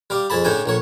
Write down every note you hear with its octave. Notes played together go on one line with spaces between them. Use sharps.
G3 F5 D6
F2 G#4 A5 B5
A2 C#3 A3 D4 G5 G#5
A#1 A3 C#5